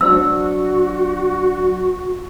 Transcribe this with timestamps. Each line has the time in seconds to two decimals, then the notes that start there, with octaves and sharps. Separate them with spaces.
0.01 F#3 D4 F#4 C5 D5 E6